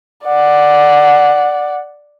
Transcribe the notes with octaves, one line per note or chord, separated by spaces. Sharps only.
D5 F#5